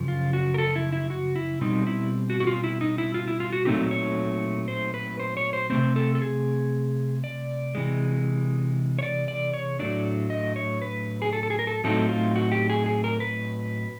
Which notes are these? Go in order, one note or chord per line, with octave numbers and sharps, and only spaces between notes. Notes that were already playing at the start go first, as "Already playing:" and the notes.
Already playing: F#2 C#3 F3
F4
F#4
A#4
A4
E4
E4
F#4
E4
B2 G3 C4 D#4
E4
F#4
F#4
F4
E4
D#4
E4
F4
E4
F4
F#4
A#2 F#3 A3 C4 D#4 G4
C#5
C5
B4
C5
C#5
C5
C3 E3 A3 C4 C5
A4
A4
G#4
D5
C3 E3 G#3
C#5
D5
D5
C#5
A2 F#3 A3 D4 D5
D#5
C#5
B4
G#4
A4
A4
G#4
A#4
A4
A2 F#3 A3 C4 D#4 A4
F4
F#4
G4
G#4
G#4
A#4
B4